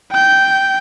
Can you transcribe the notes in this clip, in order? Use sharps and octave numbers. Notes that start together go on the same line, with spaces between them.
G5 G6